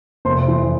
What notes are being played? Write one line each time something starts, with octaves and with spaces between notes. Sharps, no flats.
F1 C5 C6
E3